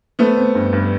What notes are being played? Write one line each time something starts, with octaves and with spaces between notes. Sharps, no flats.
A3 B3 C4
C4
G2
G2